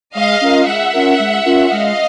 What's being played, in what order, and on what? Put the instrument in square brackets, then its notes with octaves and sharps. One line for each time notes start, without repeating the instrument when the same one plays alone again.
[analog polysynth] G#3 [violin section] D#5 F5
[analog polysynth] C#4 F4 A#4
[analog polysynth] G#3 [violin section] E5 F#5
[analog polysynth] C#4 F4 A#4
G#3
C#4 F4 A#4
[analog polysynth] G#3 [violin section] D#5 F5